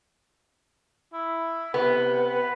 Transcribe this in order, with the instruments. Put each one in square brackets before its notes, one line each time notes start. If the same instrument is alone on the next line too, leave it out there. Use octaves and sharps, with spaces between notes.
[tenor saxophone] E4
[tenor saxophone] C3 [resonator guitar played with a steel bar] B3
[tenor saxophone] B4